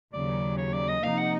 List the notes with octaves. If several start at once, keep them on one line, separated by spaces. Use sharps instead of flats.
D#2 C#3 F#3 D5
C#5
D5
D#5
C3 F3 A#3 D#4 F5
F#5